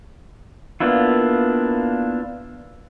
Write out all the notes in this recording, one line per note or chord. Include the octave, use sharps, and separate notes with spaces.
A#3 B3 D4 E4 F4